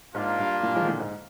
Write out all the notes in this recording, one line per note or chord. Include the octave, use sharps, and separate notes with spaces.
G#2 A#3 D4 F4
G2
G2 A#2
F3 G#3
D#3
A#2 D3
G#2